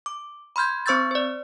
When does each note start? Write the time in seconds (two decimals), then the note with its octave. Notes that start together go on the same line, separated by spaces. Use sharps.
0.06 D6
0.56 B5 C6 F6 G6 G#6
0.86 C4 C5 C#6 E6 G6 A6
1.11 C5 D5